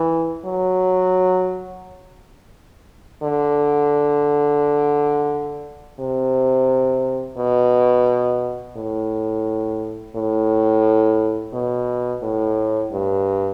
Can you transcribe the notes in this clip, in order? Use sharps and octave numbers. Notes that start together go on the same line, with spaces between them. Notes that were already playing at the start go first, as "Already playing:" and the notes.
Already playing: E3
F#3
D3
C3
B2
A2
A2
B2
A2
G2